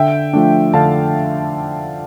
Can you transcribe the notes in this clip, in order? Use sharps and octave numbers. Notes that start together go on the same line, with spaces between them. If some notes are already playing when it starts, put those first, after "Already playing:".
Already playing: D3 E5 G5
F3 A3 D4
D3 F5 A5